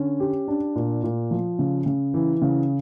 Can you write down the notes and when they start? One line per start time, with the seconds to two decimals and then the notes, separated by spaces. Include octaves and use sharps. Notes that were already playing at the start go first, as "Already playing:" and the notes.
Already playing: D3 C#4
0.20 G4
0.48 D4
0.76 A#2
1.04 A#2
1.31 F3
1.59 C#3
1.86 C#3
2.14 E3
2.42 C#3